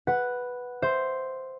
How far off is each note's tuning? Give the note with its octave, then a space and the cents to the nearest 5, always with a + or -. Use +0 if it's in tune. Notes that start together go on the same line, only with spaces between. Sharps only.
B4 +0 F#5 +0
C5 +0 E5 +0